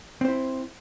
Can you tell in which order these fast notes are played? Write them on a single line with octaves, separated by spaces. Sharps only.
C4 C5 E4